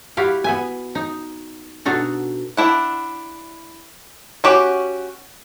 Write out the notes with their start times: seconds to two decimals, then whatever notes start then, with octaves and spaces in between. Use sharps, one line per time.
0.17 G3 E4 F#4 G4 F5 G5
0.44 B3 E5 G#5
0.95 D#4
1.85 B2 D4 D#4 F#4 A4
2.57 D4 E4 F#5
4.44 C#4 F#4 G4